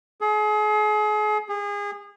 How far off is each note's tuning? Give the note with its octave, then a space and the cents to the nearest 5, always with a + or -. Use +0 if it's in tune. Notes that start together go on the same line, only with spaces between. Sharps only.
G#4 +35
G#4 -30